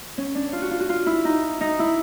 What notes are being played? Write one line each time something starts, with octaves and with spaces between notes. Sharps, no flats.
C#4
D4
F4
F#4
F4
F#4
F4
E4
D#4
D#4
E4